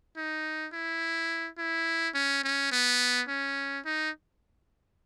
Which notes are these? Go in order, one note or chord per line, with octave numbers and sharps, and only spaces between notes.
D#4
E4
E4
C#4
C#4
B3
C#4
D#4